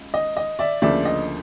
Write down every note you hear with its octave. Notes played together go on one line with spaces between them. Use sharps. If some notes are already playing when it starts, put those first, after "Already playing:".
Already playing: C#2
D#5
D#5
D5 E5
D2 C#3 F3 A#3 D4 D5 E5
D#5